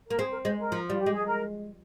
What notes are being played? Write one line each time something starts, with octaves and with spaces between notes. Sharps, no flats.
A#3 A#4
C4 G#4
A#4
G#3 C5
A#4
F3
G3 F4
G4
G#3
G#4
A#4